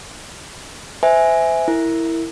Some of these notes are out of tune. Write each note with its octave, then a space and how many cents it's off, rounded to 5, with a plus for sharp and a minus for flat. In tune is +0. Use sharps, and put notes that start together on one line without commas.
C5 -35 E5 -10 G#5 +0
E4 +0 A#4 -20